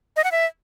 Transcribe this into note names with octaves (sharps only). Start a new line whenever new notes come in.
D#5
F#5
E5